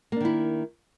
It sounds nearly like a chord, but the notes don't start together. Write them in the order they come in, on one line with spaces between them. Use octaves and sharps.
A#3 D4 D#3 E4